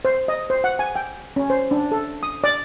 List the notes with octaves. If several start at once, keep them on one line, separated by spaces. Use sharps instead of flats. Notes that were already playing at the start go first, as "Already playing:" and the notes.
C5
D#5
C5
F#5
G#5
G5
C#4
C5
D4
A4
D#6
D5